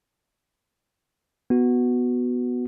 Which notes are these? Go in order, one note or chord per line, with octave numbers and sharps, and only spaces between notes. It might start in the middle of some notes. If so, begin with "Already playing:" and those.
B3 F#4